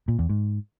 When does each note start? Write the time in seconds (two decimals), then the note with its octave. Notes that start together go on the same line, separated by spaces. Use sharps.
0.08 A#2
0.19 E2
0.30 G#2